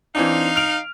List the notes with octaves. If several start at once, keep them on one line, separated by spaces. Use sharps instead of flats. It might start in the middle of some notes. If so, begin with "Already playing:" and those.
E3 C4 D4 D#4 F5
F6 D7 F7